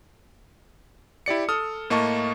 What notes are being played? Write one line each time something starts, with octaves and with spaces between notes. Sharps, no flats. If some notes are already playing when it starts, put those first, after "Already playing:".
E4 G4 D5 C#7
A4 D#6 F6
A2 A#3 D#5 A5 C#6